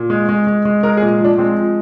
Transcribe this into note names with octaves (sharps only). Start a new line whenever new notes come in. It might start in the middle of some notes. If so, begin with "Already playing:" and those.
Already playing: A#2
G#3
G#3
G#3
G#3
G#3 A#4
G#4
A#2
F3 D4
G#3 C4
F3